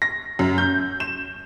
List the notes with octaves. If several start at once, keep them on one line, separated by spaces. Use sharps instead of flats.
A#6
F#2
G6
E7